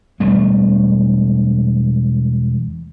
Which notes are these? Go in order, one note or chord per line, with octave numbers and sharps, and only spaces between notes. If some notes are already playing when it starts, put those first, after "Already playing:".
E1 G3 A3 B3